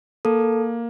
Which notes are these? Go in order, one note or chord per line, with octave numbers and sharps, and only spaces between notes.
A#3 A4